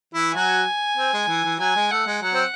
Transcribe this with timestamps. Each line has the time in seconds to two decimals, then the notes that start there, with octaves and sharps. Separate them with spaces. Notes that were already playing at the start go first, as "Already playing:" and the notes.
0.14 E3 E4
0.34 F#3 F#4 G#5
0.97 C4
1.13 G#3
1.28 E3
1.44 E3
1.59 F#3 G#5
1.75 G#3
1.91 A3 F#5
2.07 G#3
2.22 F#3 F#5
2.34 C4